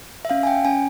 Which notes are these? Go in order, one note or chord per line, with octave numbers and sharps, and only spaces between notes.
E5
C#4 F5
G#5
G5
C#4 G#5